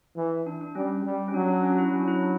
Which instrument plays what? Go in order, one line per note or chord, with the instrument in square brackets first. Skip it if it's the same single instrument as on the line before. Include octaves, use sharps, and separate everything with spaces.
[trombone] E3
[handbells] D4
D4
[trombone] G3 [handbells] C#4
[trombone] G3
[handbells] C#4
[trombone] F#3 [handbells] D4
[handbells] D4
C#4
F#4
E4
D4
[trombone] F#3 [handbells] C#4
[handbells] D4
E4
D4